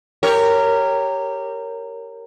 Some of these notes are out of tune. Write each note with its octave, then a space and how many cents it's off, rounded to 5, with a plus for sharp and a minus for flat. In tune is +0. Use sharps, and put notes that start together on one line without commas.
G4 +0 A#4 -15 C#5 +0